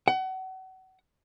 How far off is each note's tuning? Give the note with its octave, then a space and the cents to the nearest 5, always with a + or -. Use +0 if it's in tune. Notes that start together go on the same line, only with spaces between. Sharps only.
F#5 +30